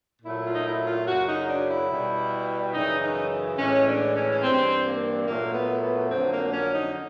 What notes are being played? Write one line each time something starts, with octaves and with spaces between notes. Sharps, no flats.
A#2 F#3 A3 E4
F4
D#4
E4
F4
F#2 C#3 F#3 F#4
D#4
D4
E4
B2 G3
F#2 C#3 E3 D#4
D#4
A2 E3 G#3 C#4
D4
C#4
C#4
G2 E3 G3 C4
A#3
A#2 F#3 A3 A#3
B3
B3
F2 D3 F#3 C4
A#3
C#4
D#4